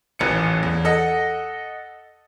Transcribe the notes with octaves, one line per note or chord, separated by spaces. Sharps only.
D#1 A1 E3 C#7
E2
A4 D#5 F#5